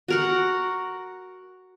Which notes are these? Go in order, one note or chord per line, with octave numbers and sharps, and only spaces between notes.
F#4 A#4 F#5